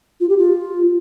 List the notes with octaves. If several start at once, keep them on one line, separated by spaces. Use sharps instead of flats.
F4
G4
F4